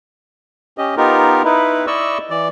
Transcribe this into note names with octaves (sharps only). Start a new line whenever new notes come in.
C#4 G4 D#5
B3 D#4 F4 G4 A#4
D#4 E4 B4
E4 D5 D#5 C#6 E6
E3 D5